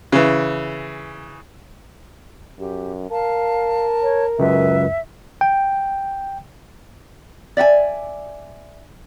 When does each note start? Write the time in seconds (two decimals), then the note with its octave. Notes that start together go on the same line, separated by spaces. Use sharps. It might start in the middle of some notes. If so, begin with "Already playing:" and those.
0.12 C#3 E3
2.59 F#2 G4
3.11 A#4 F5 A5
4.03 C#5
4.39 C#2 F#2 B4 E5
5.41 G5
7.57 D5 E5 F#5 G#5